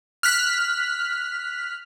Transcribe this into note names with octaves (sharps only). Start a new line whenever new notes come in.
F6 F#6 B6